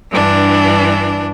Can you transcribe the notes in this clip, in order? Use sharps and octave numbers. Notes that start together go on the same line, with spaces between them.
G2 E3 D4